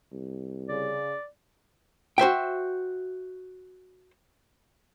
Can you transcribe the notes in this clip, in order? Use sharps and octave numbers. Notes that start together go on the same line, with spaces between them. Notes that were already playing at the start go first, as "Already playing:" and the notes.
C2
C#3 D5
F#4 C5 E5 G5